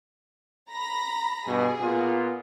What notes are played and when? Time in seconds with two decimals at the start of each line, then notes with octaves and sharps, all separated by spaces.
0.70 A#5 B5 A#6
1.46 G2 B2 G#4
1.78 A#2 B3 F4